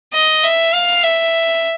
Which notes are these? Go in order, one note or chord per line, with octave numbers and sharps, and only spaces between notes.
D#5
E5
F5
E5